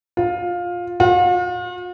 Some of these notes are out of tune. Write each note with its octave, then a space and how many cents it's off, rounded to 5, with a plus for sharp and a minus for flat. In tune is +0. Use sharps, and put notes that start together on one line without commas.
F4 +15
F4 +45